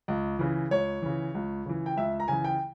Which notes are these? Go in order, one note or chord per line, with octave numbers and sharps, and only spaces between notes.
C#2
C#3 E3
C#2 C#5
C#3 E3
C#2
C#3 E3
G5
C#2 E5
A#5
C#3 E3 G#5
G5